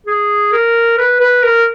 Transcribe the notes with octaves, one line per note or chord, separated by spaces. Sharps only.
G#4
A#4
B4
B4
A#4